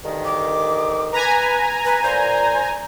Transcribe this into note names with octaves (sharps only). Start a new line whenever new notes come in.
D2 G2 D#3
D6
B4 G#5 A#5
B4
A#2 C5